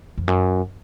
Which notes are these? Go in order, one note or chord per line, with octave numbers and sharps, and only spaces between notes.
F2
F#2